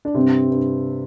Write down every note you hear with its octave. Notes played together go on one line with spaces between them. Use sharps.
D4
G2 C3 C4
G2